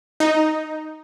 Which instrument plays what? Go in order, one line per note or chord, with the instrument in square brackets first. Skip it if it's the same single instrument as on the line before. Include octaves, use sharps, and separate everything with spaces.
[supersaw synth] D#4